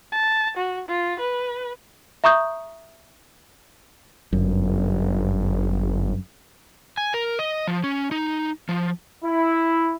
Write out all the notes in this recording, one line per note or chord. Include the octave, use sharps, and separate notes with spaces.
A5
F#4
F4
B4
E5 A#5 C#6 D#6 G6
G1 F#2
G#5
A#4
D#5
F3
C#4
D#4
F3
E4